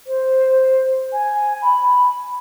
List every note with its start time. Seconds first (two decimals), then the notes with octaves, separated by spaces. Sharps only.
0.07 C5
1.13 G#5
1.62 B5